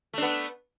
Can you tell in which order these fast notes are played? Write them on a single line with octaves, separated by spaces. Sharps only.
A3 D4 B3